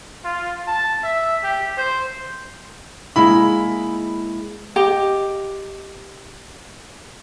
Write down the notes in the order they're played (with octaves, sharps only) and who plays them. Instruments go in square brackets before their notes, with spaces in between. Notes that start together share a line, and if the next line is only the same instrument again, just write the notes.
[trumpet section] F4
A5
E5
G4
C5
[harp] G#3 A#3 E4 [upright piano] B5
[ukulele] G4 D#5 G5